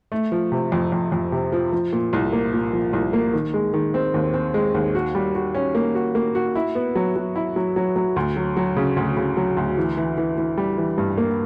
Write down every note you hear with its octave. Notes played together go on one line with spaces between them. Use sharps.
A3
F3
C3
F2
F2
F2
C3
F3
F3
A#2
C2
A#3
A#2
F3
C2
A#3
D#3
G#3
D#3
C4
D#2
C4
G#3
D#2
F#4
G3
F#4
C#4
A#3
F#4
A#3
F#4
E4
B3
F#3
F#3
E4
F#3
F#3
F#3
D2
F#3
F#3
C#3
D2
C#3
F#3
D2
E3
E3
E3
E3
G3
E3
G2
A#3